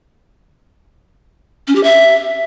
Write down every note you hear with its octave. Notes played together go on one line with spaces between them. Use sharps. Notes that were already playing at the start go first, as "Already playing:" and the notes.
C#4
G4
E5